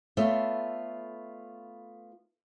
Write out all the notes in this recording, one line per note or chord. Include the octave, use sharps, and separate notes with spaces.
A3 B3 F4 A4 C#5 E5